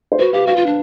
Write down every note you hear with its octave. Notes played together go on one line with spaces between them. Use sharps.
C5
F#4 B4
G4 F5
F#4 F5
F4
D4